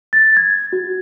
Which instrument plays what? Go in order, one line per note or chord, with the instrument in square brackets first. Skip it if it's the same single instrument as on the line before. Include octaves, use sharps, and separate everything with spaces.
[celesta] A6
G#6
F#4